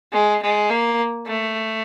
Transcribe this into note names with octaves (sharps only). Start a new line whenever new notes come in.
G#3
G#3
A#3
A3